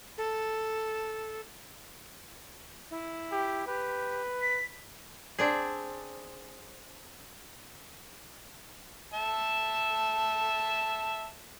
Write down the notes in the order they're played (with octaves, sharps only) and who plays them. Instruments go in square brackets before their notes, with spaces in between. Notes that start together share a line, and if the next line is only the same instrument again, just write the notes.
[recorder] A4
[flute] E4
[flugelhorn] G4
[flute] G4 [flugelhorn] B4
[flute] B6
[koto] C4 D4 G#4
[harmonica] E5 A5